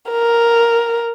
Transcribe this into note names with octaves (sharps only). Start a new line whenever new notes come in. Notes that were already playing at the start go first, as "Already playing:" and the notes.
A#4